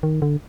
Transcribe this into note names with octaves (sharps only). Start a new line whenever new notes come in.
D#3
D3